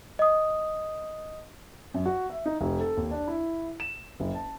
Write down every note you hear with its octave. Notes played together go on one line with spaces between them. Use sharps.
D#5 D#6
F#2
F#4
E5
D#4
F1
A4
D#2
D4
E4
E7
F#1
A5